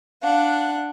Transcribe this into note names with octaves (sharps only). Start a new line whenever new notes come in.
D4 F5 F#5